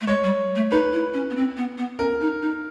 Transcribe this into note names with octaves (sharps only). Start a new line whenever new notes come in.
A3
G#3 C#5
G3
A3
D#4 B4
E4
C#4
B3
C4
B3
B3
C#4 A#4
D#4
D#4